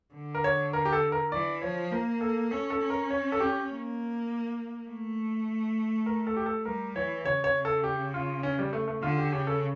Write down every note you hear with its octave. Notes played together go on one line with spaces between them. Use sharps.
D3
A#4
C#5
A#4
G4
A4
A#4
E3 D5
F3 C#5
A#3 A#4
A4
C#4 A4
A4
C#4
A#4
C#5
A4
G4
A#3
A3
A#4
A4
G4
A4
G3 A#4
E3 C#5
C#3 C#5
C#5
C#3
A4
G4
F4
C#4
G3
A3
A3
D3 F4
G4
C#3 G4
A4